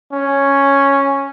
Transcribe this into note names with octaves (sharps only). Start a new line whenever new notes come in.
C#4